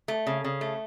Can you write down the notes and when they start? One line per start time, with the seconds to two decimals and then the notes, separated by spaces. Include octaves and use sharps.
0.08 A3
0.27 C#3
0.44 C#3
0.61 A3